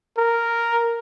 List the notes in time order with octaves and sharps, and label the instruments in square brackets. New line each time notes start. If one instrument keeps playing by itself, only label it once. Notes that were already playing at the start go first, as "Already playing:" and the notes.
[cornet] A#4